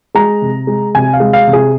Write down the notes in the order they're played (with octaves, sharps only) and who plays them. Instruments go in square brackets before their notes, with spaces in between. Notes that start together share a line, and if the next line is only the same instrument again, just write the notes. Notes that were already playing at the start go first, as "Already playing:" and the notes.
[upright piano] G#3 A#5
C3
G#3
C3 G#5
F5
G#3
F5
C3
G#4